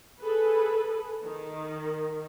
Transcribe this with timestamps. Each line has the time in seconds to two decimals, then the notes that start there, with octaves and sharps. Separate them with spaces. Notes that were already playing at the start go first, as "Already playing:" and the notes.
0.20 G#4 A4 B4
1.24 D#3